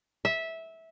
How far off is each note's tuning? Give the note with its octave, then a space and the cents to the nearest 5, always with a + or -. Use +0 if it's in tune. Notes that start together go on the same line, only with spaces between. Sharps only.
E5 -15